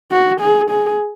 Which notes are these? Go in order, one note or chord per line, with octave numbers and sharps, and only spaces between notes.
F#4
G#4
G#4